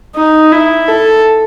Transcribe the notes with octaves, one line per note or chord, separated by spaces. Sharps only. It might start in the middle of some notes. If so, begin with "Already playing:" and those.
D#4
E4
A4